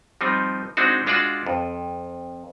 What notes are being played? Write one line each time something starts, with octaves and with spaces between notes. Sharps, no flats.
F3 G3 C4 D#4
G#3 C4 D4 D#4 F#4
G#3 D4 F4 F#4 D5
F2